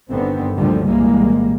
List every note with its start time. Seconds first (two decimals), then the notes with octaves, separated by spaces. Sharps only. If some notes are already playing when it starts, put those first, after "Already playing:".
0.11 G1 D3 D#3 B3 C4
0.57 D2 A#2 D3 D#3 F3 G3
0.86 C2 A#2 E3 G3 G#3 A#3